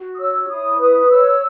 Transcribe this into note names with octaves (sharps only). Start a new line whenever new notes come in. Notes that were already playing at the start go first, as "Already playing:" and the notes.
Already playing: F#4
D#6
C#5 E6
E4 D#6
B4 D#6
C#5 E6